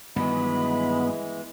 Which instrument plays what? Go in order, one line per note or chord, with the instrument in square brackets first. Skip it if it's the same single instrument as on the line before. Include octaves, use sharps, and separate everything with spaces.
[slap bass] G2 D#3 F#3 [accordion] E3 G#3 [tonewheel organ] B3 [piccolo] B5